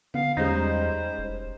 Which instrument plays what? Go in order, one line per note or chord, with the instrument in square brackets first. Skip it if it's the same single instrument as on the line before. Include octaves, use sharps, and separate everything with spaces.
[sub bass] D3 [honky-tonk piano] B3 [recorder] F5
[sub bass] E2 [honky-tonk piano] G3 G#3 C#4 [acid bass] D#4 [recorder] C5
[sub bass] F1